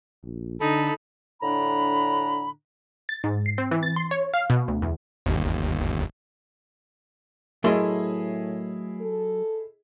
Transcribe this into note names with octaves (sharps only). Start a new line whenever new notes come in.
A#1
D3 D#4 A4 B5
A2 D3 D4 A#5 B5
A6
G#2
C7
C4
E3
A6
C6
C#5
F5
B2
D2
E2
G1 D#2
A2 F#3 A3 E4 G#4 A#4 D#5 C6
A4